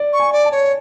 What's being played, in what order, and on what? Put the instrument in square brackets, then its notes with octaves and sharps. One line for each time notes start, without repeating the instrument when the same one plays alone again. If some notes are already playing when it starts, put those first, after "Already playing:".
Already playing: [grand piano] D5
[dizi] C#6
[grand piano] G#5
[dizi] D5
[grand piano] A5
[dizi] C#5